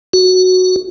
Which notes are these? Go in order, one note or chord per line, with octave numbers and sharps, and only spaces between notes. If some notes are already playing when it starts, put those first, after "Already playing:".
F#4